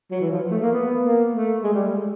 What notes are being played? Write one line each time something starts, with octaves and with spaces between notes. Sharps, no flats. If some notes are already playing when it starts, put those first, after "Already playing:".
F#3
E3
F3
A3
A#3
B3
A#3
A3
G#3
G3
A3
G#3